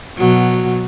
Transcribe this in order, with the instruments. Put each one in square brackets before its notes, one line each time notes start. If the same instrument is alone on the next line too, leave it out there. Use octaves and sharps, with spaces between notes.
[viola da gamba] B2 F#3